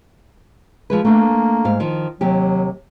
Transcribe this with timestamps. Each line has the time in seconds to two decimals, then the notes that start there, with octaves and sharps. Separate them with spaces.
0.90 F3 G#3 B4
1.05 A3 A#3 D4
1.65 G#2 F5
1.80 D#3 F3
2.21 D#2 C3 F#3 G4